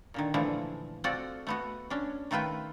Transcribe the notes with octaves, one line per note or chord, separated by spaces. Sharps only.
A#2 D3 D#3
A#2 D3 E3 F3 A3
C4 F4 F#4 A4 D5
A3 B3 F#4
C#4 D4
D#3 A3 F4 B4 G5